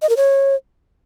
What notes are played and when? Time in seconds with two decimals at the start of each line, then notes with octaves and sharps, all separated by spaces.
0.02 D#5
0.09 A#4
0.17 C#5